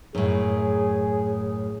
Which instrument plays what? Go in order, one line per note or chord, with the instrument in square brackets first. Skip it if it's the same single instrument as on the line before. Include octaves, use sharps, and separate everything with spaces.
[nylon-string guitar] F#2 A2 [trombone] G#4